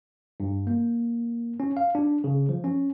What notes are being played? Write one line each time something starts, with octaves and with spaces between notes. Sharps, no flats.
G2
A#3
C#4
F5
D4
C#3
F3
C#4